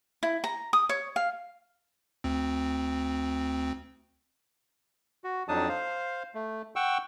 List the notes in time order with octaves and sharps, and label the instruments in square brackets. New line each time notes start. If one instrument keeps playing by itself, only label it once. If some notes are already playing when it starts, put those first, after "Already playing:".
[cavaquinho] E4
A#5
D#6
C#5
F5
[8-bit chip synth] D2 C4
[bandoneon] F#4
F2 F#3 D4 D#4 A5 D#6
C5 F5
A3
F#5 G5 C#6 E6